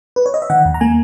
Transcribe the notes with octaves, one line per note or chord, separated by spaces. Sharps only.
B4
C#5
D#5
E5
D#3 F#5
D#2
A#5
A#3 G#5